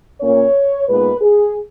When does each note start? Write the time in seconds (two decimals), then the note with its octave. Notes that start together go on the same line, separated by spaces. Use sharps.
0.21 A#2 A#3 C#4 C#5
0.88 A#2 G#3 B3 D#4 B4
1.21 G#4